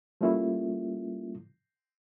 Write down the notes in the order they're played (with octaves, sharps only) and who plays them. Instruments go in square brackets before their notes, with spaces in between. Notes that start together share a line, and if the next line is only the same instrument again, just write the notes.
[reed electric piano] G3 A3 A#3 C#4 E4 F4